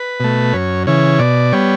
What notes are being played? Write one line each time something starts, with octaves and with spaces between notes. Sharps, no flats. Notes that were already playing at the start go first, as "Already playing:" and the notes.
Already playing: B4
B2 A3
F#2 C#5
C#3 E3 C#5
B2 D5
G3 B3 C#5